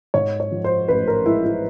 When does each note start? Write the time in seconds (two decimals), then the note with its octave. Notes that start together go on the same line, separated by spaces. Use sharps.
0.14 G#2 C#5
0.40 C#5
0.51 F3
0.64 C5
0.88 A1 B4
1.07 A#4
1.26 G#3 E4
1.45 E4